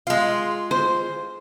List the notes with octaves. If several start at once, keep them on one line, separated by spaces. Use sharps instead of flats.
G#3 F4
C5